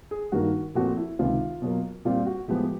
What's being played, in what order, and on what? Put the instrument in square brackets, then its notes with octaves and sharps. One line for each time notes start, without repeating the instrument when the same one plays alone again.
[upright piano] G#4
G2 D#3 G3 A#3 F#4
A#2 F3 A3 C4 F#4
E4
C#2 C3 D#3 F4
B2 F#3 A#3
A#2 G3 C4 F4
F#4
A2 F3 G#3 B3 G4